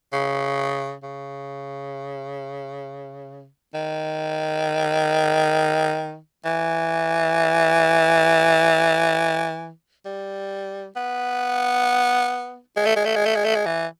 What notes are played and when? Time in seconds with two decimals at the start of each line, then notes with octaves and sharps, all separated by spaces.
0.13 C#3
1.03 C#3
3.74 D#3
6.45 E3
10.05 G3
10.96 B3
12.76 G#3
12.86 A3
12.96 G#3
13.05 A3
13.16 G#3
13.25 A3
13.35 G#3
13.45 A3
13.55 G#3
13.66 E3